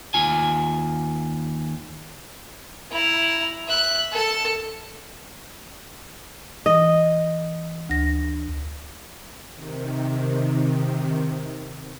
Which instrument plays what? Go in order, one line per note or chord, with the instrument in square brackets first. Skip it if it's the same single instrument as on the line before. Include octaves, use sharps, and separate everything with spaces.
[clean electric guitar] D#2 F4 G#5
[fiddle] E4 A#5
E5 F#6
A4 A5
[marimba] E3 [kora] D#5
[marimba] D2 A#6
[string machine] C3 D#3